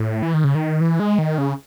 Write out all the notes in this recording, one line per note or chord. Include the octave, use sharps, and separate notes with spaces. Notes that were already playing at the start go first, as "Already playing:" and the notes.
Already playing: A2
E3
D#3
C#3
D#3
E3
G#3
D#3
C#3